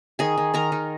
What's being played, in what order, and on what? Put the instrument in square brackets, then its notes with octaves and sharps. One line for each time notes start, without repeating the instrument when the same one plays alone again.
[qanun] D#3 G#4 G#5
D#3
D#3 A#4 A#5
D#3